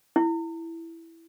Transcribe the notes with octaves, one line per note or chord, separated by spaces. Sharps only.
E4